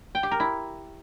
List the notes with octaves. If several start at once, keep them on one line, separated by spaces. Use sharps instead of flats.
G5
G4
A#4
E4